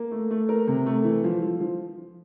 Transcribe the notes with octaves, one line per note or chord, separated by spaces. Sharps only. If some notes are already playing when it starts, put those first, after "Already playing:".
Already playing: A#3
A3
A3
A#4
C3
A3
E3
F3
F3
F3